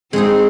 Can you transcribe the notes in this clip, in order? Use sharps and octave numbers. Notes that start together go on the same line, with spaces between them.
G#3 C4 D#4 G#4